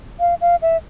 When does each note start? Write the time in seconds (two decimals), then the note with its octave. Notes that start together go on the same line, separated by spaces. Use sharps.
0.20 F5
0.41 F5
0.62 E5